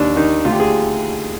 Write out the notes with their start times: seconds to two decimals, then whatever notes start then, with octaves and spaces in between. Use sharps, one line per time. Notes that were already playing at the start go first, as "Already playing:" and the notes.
Already playing: D#2 D4
0.16 D#3 D#4
0.45 D2 F4
0.52 G4
0.60 G#4